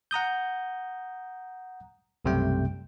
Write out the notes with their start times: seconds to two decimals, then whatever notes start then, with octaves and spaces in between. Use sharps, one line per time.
0.11 F#5 A#5 D#6 G6
2.25 B1 F#2 C3 G3 A3 G5